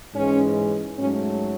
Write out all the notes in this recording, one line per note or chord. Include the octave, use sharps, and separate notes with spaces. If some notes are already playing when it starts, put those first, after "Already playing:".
G#2 E3 G#3 C#4
G#2 F#3 A3 C#4